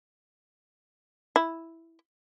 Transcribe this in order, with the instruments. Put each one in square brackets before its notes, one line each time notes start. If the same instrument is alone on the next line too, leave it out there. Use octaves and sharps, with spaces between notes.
[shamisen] E4